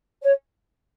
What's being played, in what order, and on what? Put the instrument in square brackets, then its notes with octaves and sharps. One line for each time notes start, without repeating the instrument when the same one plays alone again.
[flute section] C#5